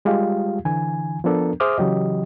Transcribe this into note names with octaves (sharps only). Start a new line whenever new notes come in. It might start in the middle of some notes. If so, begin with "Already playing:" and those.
G3 G#3 F4 G4 F5
D3 E3 G#5
F3 B3 D4 A4 A#4
G#4 C5 E5 D6 D#6 F6
C#3 E3 F#3 G4 D#5